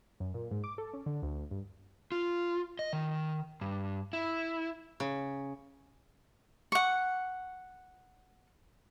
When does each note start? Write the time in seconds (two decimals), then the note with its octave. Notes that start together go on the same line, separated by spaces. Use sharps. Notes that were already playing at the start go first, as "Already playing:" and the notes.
0.20 F#2
0.34 A#2
0.51 G#2
0.64 D6
0.78 A4
0.93 C#4
1.06 D3
1.23 D2
1.51 G2
2.12 F4
2.79 D#5
2.93 D#3
3.61 G2
4.13 E4
5.00 C#3
6.72 F#5 C#6